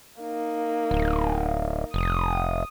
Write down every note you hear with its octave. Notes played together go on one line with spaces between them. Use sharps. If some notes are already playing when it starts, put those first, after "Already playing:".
A#3 D#4
D1
F1 D#6